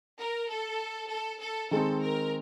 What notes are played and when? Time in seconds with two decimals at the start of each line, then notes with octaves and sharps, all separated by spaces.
0.20 A#4
0.49 A4
1.10 A4
1.41 A4
1.71 D#3 G#3 C4 A4
2.02 A#4